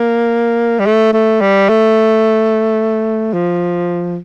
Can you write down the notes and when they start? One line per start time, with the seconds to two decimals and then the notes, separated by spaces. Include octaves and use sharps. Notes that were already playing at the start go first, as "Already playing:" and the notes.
Already playing: A#3
0.79 G3
0.86 A3
1.13 A3
1.41 G3
1.69 A3
3.33 F3